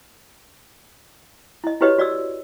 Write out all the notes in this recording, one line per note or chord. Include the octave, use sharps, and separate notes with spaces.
E4 D#5
E4 F#4 G4 B4 C#5 D#5
F#4 D5 D#5 E6